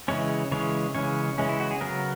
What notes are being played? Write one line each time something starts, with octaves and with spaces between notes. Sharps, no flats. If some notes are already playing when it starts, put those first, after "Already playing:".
C#3 E3 G#3 C#4 C#5
C#3 E3 G#3 C#4 C#5
C#3 E3 G#3 C#4 C#5
C#3 E3 G#3 C#4
E4
F#4
G#4
C#3 F#3 B3 A#4